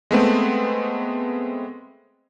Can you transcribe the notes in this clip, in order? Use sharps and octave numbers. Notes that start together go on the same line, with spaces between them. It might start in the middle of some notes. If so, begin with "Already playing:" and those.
G#3 A3 B3 C4